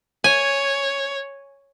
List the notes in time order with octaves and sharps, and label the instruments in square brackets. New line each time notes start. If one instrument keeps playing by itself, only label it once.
[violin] C#5 [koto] G#5